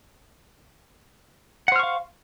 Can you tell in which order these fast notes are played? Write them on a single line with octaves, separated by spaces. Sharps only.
F#5 C5 F6 C#6 F5